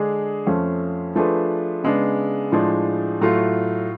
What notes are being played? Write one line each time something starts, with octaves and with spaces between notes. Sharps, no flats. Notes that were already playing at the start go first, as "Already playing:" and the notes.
Already playing: D3 G#3 D4 G#4
F2 F3 A3 C#4
F3 A3 D4 G#4 B4
C#3 G#3 B3 D4
A2 F3 G#3 D4
A2 F#3 A3 F4